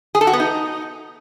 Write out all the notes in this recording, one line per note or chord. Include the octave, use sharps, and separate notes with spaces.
G#4
A4
F#4
B3
D#4